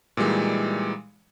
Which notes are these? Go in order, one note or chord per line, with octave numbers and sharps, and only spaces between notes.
A#2 E3 G3 G#3 D#4